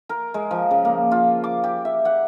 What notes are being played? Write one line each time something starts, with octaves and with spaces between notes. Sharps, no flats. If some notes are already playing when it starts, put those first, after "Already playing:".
A#4
G#3
F3
C#3
A#3
F4
D6
G4
E5
F#5